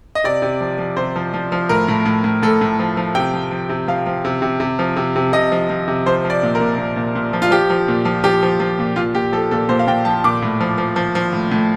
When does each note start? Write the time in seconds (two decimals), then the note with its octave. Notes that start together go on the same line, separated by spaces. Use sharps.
0.15 D#5
0.24 C3 D5
0.42 C3
0.61 F3
0.78 F3
0.97 C3 C5
1.16 F3
1.34 F3
1.52 F3
1.69 A2 A#4
1.88 A2
2.06 A2
2.24 A2
2.42 A2 A4
2.61 A2
2.79 F3
2.97 F3
3.15 C3 G5
3.34 F3
3.51 F3
3.69 C3
3.88 F3 F5
4.06 F3
4.25 C3
4.42 C3
4.60 C3
4.79 F3
4.97 C3
5.16 C3
5.33 C3 D#5
5.52 F3
5.70 F3
5.88 C3
6.06 F3 C5
6.25 F3
6.30 D5
6.43 A#2
6.55 A#4
6.60 A#2
6.78 A#2
6.96 A#2
7.15 A#2
7.33 F3
7.42 F4
7.51 F3 G4
7.70 F3
7.88 A#2
8.05 F3
8.24 F3 G4
8.43 F3
8.60 F3
8.79 A#2
8.96 A#2 F4
9.14 A#2 G4
9.32 F3 A4
9.51 A#2 A4
9.69 A#2 C5
9.79 F5
9.87 A#2 G5
10.05 F3 A5
10.24 A#2 D6
10.42 A2
10.61 F3
10.78 F3
10.96 F3
11.15 F3
11.33 A2
11.51 A2